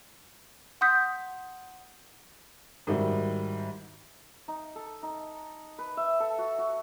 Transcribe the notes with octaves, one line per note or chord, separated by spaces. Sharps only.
F#5 C6 D#6 G6 B6
G#2 D#3 G3 E4 F#4
D#4
A4
D#4
B4
E5
A4
F#4
F#4